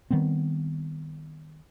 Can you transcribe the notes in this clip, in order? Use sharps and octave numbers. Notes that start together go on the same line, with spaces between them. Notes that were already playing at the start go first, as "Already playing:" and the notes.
D#3 G3 B3 C4